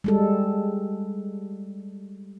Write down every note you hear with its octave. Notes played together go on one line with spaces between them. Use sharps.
G3 G#3 A4